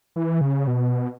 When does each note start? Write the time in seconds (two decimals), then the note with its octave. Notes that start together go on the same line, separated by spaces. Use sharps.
0.16 E3
0.41 C#3
0.67 B2